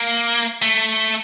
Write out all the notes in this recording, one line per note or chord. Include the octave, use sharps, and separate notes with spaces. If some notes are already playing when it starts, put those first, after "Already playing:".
Already playing: A#3
A3